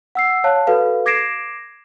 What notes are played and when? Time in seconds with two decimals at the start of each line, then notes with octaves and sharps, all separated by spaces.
0.15 F#5 E6 C7
0.44 C#5 F5 A5 F#6
0.67 F#4 A4 B4 F5
1.06 D6 G#6 A#6 C7 D7 E7